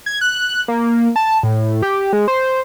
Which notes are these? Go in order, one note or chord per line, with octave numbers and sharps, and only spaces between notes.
G#6
F#6
A#3
A5
A2
G4
G#3
C5